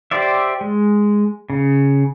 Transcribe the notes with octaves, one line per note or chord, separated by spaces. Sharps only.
G4 C5 D5 E5
G#3
C#3